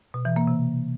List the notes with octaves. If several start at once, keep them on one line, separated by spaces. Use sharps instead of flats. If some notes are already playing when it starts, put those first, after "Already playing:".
B2
E3
A#3
C3